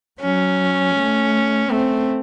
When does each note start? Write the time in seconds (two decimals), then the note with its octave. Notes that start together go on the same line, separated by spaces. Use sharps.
0.21 F#3 C#4
0.95 A3
1.70 A3 C4